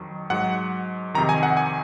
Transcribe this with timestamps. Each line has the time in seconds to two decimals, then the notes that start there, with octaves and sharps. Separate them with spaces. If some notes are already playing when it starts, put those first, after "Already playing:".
Already playing: F2 D#3 F#3
0.30 G#2 F#3 F#5
1.14 F2 C3 D#3 A#5
1.29 G#5
1.43 F#5
1.57 G#5